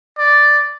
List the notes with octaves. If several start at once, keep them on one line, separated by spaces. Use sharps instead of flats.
D5